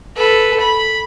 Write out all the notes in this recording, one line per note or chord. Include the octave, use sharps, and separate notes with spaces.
A4 B4
B5